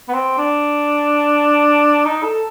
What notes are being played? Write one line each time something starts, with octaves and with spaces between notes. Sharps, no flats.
B3
C4
D4
D#4
A4